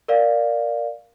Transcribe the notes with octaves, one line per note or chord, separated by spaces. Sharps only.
A#4 D5 F5